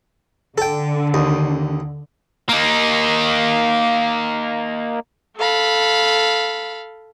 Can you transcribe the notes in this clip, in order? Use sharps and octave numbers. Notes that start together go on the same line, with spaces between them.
D3 A4 G5
D#2
A#3 D#4
A4 F5 B5